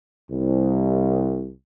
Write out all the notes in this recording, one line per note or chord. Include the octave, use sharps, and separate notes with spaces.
C2